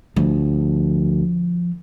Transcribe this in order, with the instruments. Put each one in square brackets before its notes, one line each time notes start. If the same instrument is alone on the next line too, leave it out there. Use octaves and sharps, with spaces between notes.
[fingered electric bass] D2 [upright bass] F3